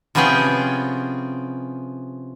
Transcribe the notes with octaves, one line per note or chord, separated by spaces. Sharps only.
C3 F3 B3 C#4 G#4 G5